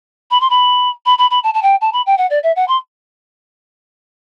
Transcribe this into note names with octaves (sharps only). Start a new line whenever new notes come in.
B5
C6
B5
B5
B5
B5
A5
A5
G5
A5
B5
G5
F#5
D5
E5
F#5
C6